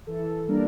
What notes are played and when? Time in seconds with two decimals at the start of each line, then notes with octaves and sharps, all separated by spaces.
0.07 E3 A4
0.48 G3 A#3 D4 A#4